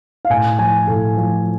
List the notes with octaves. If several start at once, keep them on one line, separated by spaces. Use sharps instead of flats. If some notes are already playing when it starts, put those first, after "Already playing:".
F5
A2 G#5
F3 G#5
A2 A4
F3